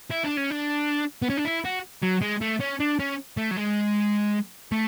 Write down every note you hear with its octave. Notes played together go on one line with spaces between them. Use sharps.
E4
D4
C#4
D4
B3
C#4
D4
E4
F#4
F#3
G#3
A3
C#4
D4
C#4
A3
F#3
G#3
A3